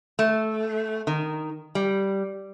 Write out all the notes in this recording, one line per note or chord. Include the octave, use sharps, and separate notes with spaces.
A3
D#3
G3